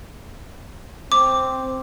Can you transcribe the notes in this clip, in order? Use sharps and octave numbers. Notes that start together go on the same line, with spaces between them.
C4 D6